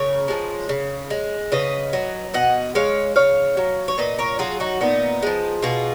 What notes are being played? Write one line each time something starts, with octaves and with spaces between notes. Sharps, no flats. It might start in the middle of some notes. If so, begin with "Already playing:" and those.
Already playing: C#3 A#4 C#5
F3 G#3
C#3
G#3
C#3 B4 D#5
F#3
B2 D#5 F#5
G#3 C#5 F5
C#3 C#5 F5
F#3
C#5
A#2 B4 D#5
A#4 C#5
F#3 F4 G#4
D#4 F#4
A#2 B3 D#4
F3 G#3
B2 F4 G#4